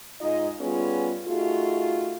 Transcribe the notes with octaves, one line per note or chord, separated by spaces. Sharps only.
G#2 D#4 F4 D#5
G3 B3 C#4 F4 G#4
A3 D#4 F4 F#4 G#4